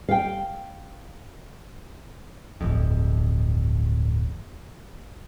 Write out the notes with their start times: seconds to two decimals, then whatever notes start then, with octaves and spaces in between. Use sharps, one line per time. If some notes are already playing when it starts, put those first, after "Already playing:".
0.09 F5 G5
2.61 D1 G1 F2